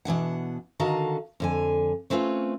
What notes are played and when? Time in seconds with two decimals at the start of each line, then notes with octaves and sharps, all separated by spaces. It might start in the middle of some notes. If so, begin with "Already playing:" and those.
0.05 B2 E3 D4 F#5
0.80 D3 D#3 F#4 F5 A5 A#5
1.40 F2 D3 G#5
2.10 A3 C4 C#4 F4 B4